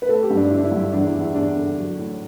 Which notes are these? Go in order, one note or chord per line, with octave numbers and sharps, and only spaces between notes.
B4
A3 A4
G4
G2
D4
D3 E4
D4
E4
G2
E4
E2 D4
E4
E2
E4
E2 D4
D3
F#3
A2